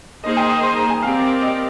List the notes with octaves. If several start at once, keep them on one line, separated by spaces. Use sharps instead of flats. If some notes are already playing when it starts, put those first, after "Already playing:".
A#3 D#4 G#4 C5 D#5
G5
D#6
C6
A#5
G#5
C4 G4 A#4 D5 F5
D#5